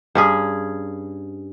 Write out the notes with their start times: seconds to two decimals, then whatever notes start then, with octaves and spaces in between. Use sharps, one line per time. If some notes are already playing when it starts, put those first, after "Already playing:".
0.15 G2 C#4 G#4